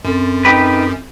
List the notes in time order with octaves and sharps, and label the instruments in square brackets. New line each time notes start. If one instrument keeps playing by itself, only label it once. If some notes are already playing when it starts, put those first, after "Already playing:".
[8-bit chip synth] F#2 [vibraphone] C4 A4
[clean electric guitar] D#4 G4 B4